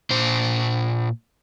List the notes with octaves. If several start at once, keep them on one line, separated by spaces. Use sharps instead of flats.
A#2 C5